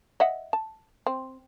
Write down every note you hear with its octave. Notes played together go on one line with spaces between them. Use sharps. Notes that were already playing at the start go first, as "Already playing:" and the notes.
D#5 E5 F#5
A5
C4